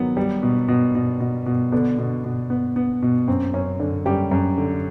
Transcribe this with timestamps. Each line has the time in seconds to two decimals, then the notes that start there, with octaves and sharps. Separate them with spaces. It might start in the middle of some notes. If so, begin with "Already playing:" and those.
Already playing: D#3 F#3 B3
0.17 G3
0.43 B2
0.68 B2
0.95 B2
1.20 B2
1.46 B2
1.72 D3 B3 D4
1.99 B2
2.24 B2
2.50 B3
2.76 B3
3.03 B2
3.28 F#2 C4
3.54 F#2 C#4
3.80 F#2 D3 D4
4.05 F#2 G3 G4
4.31 F#2
4.58 D3